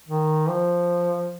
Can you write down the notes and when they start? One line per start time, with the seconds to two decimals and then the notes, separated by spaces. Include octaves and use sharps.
0.08 D#3
0.48 F3